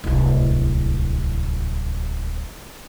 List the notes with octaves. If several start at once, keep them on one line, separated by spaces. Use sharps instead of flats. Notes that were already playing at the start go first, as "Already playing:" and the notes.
D1 C2